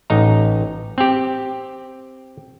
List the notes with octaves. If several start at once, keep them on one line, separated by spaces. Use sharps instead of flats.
A1 D#4 A#5
C4 G4